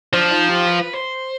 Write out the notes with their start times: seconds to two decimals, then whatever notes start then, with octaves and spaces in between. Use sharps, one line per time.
0.13 F3 D4
0.31 D#4
0.49 G4
0.67 B4
0.93 C5